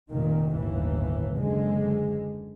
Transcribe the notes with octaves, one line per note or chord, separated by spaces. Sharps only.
F1 A#2 D#3
G1 D#2 A2 E3
F#1 D3 G#3